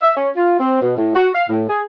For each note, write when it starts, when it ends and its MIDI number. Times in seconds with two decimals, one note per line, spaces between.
0.02 0.13 76
0.17 0.29 61
0.36 0.58 65
0.60 0.80 60
0.82 0.95 47
0.97 1.12 45
1.15 1.29 66
1.35 1.45 77
1.49 1.65 45
1.69 1.82 68